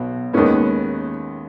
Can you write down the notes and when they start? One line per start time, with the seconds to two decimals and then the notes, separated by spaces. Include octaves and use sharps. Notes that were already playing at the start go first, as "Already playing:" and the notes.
Already playing: B1 B2 F#3
0.33 D#2 D#3 G#3 B3 C#4